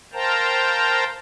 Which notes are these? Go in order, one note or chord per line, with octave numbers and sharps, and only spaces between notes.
A#4 C5 F5 G5 A5 A#5